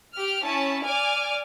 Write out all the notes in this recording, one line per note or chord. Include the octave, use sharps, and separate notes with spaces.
G4 F6
C#4 E4 A5
D5 G#5 D6 F6